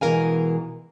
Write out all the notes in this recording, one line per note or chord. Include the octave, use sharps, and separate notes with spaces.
B2 E3 G#3 A#4 F5 G#5